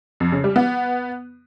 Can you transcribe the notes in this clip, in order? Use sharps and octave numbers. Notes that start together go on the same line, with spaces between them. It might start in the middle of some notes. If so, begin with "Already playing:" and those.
F2
C#3
G3
B3